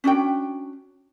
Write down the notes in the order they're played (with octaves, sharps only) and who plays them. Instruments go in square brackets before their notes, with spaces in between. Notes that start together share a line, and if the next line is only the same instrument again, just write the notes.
[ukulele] C#4 D4 F#4 G5